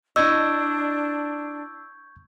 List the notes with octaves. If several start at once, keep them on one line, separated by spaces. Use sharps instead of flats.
D4 E4 D#5 C#6 E6 G6 G#6